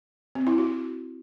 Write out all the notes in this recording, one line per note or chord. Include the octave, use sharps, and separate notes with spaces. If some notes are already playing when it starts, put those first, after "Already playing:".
C4
E4
F#4